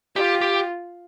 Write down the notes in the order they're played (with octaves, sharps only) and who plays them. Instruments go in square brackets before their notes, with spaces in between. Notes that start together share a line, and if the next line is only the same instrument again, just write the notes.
[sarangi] F4 [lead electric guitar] G4
[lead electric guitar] G4